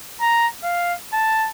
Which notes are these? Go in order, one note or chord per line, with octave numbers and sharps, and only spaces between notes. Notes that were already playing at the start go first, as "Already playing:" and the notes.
A#5
F5
A5